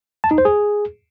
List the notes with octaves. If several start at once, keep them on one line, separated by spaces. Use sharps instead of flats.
A5
D#4
C5
G#4